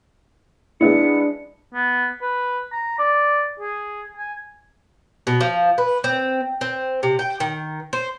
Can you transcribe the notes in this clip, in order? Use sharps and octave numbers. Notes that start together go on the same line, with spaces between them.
G#3 B3 D4 E4 C#7
B3
B4
A#5
D5
G#4
G#5
B2
F3
B4
C4
C4
C3
G5
D#3
C5